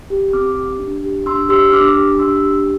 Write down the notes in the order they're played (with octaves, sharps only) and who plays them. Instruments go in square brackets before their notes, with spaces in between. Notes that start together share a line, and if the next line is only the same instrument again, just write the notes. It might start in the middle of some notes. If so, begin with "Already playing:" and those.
[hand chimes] G4
C4 D6 F6
G4
D4
G4
D4 C6 E6
G4 C6 E6
D4 D6 F6
G4
D4 C6 E6
G4